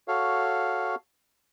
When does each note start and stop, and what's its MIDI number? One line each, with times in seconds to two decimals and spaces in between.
0.08 0.95 66
0.08 0.95 69
0.08 0.95 73
0.08 0.95 77